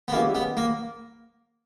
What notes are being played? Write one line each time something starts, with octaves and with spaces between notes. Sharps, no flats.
B3
G#3 A#3 C#4 E4 G4
B3
A#3